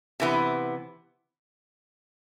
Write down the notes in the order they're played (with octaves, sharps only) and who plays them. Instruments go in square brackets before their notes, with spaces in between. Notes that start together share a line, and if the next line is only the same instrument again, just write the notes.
[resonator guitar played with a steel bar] C3 E3 B3